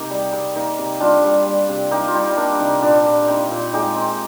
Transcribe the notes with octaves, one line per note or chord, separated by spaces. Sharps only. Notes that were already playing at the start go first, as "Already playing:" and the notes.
Already playing: C3 A#3 D#4 G4 A#4
G3
C3
A#3 D#4
C3
G3 D4 F4
G3
G3
C3
A#3 D#4 G4
F4
G3 D#4
A#3 D4
C3 D#4
A#2 D4
A#2
C4 D#4
A#2
G#3 D#4 G4
C4